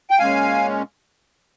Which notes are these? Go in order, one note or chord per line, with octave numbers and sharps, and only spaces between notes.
G5
A#2 G#3 C#4 F5 G#5